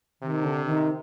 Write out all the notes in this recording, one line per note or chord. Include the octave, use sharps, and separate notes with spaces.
C3 D#3
D3
D#3